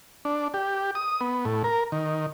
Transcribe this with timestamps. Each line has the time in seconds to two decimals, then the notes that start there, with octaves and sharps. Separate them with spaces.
0.25 D4
0.54 G4
0.95 D#6
1.21 B3
1.45 A2
1.64 A#4
1.92 D#3